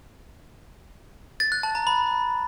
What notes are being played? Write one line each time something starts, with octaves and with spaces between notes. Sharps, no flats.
A6
F#6
A5
A#5
B5